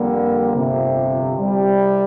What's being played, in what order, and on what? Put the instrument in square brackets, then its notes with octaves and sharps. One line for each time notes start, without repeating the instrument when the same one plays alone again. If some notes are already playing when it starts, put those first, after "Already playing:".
Already playing: [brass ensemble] F2 D3 G3 A#3
G1 F2 C3
C2 C3 G3